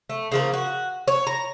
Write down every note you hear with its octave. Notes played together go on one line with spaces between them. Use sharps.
A3
C#3 F3 A#3
F#4
C#5
A#5